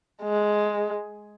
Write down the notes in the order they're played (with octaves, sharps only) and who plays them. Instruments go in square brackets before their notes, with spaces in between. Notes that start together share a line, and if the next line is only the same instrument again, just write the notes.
[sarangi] G#3